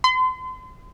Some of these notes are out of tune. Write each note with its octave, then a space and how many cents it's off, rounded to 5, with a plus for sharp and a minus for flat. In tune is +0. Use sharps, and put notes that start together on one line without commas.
C6 -40